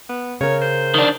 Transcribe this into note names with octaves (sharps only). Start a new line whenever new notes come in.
B3
C#3 A#4 C#5
C5
D#3 D4